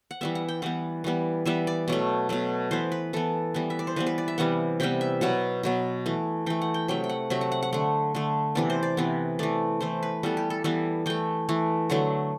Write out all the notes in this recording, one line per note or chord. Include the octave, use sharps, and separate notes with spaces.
F#5
E3 G3 B3 E5
F#5
G5
E3 G3 B3 F#5
E3 G3 B3
E3 G3 B3 E5
D5
B2 F#3 A3
B2 F#3 A3
E3 B3 C5
B4
E3 B3 A4
E3 G3 B3
E5
D5
C5
E3 G3 B3 B4
B4
D5
E5
C3 E3 G3 B3 F#5
C3 E3 G3 B3 G5
E5
B2 F#3 B3 F#5
B2 F#3 B3
E3 A3
E3 A3 G5
F#5
G5
C3 F#3 A3 G5
G5
F#5
C3 F#3 A3 E5
F#5
F#5
F#5
D3 A3 F#5
D3 A3
C3 E3 B3 D5
C5
D5
C3 E3 B3
E3 A3 D5
E3 A3 C5
B4
E3 G3 B3 A4
G4
A4
E3 G3 B3 A4
E3 A3 G5
E3 A3
D3 F#3 A3 F#5